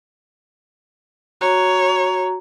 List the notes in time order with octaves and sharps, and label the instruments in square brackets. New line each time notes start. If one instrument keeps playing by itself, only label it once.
[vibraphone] F#4 A#5 [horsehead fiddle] C#5